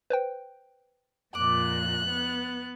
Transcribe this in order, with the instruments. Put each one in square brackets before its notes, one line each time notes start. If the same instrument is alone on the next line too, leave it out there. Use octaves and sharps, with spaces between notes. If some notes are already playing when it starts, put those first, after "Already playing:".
[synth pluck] B4 C5 G5
[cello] F2 A#2 [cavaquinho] D6 [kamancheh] F#6
[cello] B3